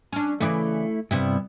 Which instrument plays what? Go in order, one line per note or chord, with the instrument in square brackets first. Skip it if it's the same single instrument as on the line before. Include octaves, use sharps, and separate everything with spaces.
[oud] C#4 D4
[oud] C#3 E3 D5 [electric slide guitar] A3 E4
[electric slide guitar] G2 C3 [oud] G3 B3 E4